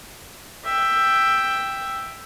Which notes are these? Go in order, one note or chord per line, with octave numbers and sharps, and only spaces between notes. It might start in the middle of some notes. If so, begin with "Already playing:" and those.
E5 G5